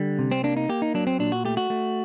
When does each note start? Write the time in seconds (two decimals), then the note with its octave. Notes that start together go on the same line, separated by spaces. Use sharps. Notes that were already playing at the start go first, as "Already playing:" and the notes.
Already playing: D3 G3
0.19 C3
0.31 C4
0.44 A#3 D4
0.57 D#4
0.69 A#3 G4
0.82 D#4
0.94 F#3 D4
1.07 C4
1.19 A#2 D4
1.32 F#4
1.45 A3 G4
1.57 F#4
1.70 A3